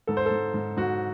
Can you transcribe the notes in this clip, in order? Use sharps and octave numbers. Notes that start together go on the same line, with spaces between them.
G#2 A4
C5
G#2 A4
G#2
G#2 F#4